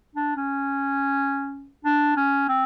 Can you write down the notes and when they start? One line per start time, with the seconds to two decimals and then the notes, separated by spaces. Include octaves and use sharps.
0.15 D4
0.36 C#4
1.85 D4
2.16 C#4
2.48 C4